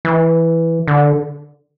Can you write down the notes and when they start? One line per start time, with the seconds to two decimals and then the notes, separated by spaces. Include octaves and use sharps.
0.05 E3
0.88 D3